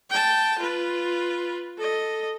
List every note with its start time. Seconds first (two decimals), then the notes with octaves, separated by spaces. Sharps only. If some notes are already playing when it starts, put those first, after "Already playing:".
0.10 G5 A5
0.59 F4 B4
1.78 A4 D#5